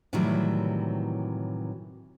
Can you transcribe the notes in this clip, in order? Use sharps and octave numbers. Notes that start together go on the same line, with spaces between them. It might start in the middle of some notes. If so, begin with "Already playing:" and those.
A2 C3 D#3 E3 F#3 G3